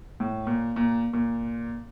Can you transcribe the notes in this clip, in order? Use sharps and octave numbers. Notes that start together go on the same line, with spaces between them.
A2
A#2
A#2
A#2